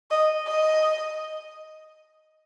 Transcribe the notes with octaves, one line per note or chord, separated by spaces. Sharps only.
D#5
D#5